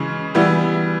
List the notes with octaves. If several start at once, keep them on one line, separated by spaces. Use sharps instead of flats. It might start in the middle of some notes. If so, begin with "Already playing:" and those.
Already playing: C#3 E3 G#3 C#4
E3 G3 B3 E4